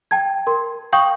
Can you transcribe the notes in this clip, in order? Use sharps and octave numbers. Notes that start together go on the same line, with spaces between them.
G5 A5 G#6
A#4 C6
F5 G5 C#6 D#6 G6 F#7